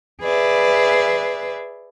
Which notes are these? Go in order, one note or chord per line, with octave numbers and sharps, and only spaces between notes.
G#4 B4 D5 E5